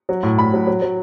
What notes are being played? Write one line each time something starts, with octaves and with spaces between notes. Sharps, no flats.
F#3
A2
A2 B5
F#3
F#3
F#3